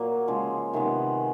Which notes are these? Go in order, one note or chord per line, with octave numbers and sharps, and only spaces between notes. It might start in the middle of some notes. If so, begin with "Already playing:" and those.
Already playing: A#2 F#3 A#3
C#3 F3 G#3
C3 D#3 G#3 B3